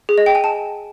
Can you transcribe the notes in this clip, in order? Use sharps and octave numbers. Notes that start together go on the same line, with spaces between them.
G#4
D#5
G5
G#5
A5